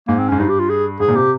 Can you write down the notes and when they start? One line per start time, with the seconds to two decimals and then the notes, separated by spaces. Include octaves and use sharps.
0.08 G#2 A#3
0.19 C4
0.29 G#2 C#4
0.39 G2 D#4
0.49 G4
0.60 F4
0.70 G#4
1.00 G#2 G#4
1.08 A#2
1.15 C3 G4